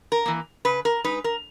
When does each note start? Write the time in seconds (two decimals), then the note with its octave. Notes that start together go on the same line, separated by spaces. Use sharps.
0.12 A#4
0.26 E3 A#3
0.65 C#3 B4
0.85 A#4
1.04 G#3 D#4 B4
1.24 A#4